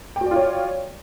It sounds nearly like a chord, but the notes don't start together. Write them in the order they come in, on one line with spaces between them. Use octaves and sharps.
G5 F#4 D5 F4 C#5